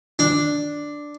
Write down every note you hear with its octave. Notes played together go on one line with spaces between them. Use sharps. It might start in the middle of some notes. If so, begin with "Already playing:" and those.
D4